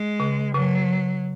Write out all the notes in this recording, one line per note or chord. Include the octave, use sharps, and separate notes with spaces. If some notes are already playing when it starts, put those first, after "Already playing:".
Already playing: G#3
C#3
C#3 F#3